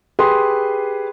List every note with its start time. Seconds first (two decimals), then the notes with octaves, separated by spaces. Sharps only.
0.19 G4 G#4 B4 C6 D#6